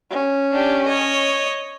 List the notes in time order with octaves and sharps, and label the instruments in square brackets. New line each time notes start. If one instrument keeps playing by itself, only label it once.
[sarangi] C#4
[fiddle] D4 G4
C#5 D#5